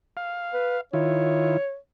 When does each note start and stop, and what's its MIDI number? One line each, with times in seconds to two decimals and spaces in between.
0.17 0.81 77
0.54 0.78 71
0.93 1.57 51
0.93 1.57 64
0.93 1.57 65
0.93 1.77 73